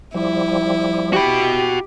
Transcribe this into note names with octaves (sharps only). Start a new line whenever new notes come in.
F3 G3 E4
F#4 G4 B5